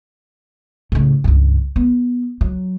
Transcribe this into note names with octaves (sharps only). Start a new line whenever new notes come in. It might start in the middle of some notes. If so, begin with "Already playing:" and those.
A2 C#3
C#2 G2
B3
F#3